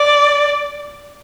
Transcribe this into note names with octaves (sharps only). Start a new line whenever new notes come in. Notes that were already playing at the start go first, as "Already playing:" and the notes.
Already playing: D5